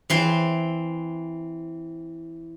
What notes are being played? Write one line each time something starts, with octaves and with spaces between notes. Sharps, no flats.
E3 C4 C5